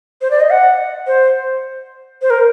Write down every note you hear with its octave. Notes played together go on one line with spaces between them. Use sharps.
C5
D5
D#5
F#5
C5
C5
A#4